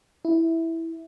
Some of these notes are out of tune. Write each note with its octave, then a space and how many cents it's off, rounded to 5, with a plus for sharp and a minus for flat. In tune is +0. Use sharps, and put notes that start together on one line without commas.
E4 -5